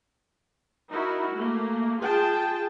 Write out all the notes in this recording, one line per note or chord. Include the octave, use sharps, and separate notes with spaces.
D#4 E4 F#4 A#4
A3 A#3
F4 G#4 G5 A5